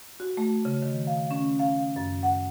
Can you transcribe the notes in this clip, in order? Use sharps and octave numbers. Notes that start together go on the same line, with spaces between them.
F#4
A3
C#3
D#3
F5
C#4
F5
F#2
F#5